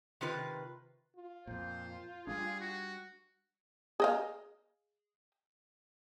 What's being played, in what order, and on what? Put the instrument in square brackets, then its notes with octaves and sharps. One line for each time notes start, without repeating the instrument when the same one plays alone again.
[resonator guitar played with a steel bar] C3 D#3 F4 B4
[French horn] F4
[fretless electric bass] F2 A#2 [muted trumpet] C5
[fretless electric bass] G3 A#3 D4 [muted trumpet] G#4
[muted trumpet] F#4
[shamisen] G#4 D#5 F5